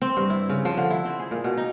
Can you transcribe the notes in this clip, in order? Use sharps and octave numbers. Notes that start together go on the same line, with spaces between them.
C4
G2
E4
C#3
F3
D3
E4
C4
G#4
A#2
B2
D#4